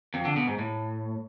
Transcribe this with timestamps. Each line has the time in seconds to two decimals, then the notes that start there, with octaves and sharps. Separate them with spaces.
0.14 F2
0.25 D3
0.36 B2
0.47 G#2
0.59 A2